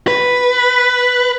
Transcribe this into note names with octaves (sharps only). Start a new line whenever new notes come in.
B4